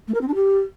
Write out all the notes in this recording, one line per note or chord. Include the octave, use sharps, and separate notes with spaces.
A3
A#4
C4
D4
G4